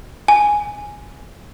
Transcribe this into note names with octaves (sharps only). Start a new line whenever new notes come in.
G#5